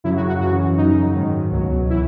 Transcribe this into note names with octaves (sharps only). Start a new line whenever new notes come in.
F#2 C#3 F#3 E4
F#4
F#4
F#2 C#3 E3 F#4
F#2 C#3 F#3 D#4
G#2 D#3 F#3
C#2 B2 F#3
E3 E4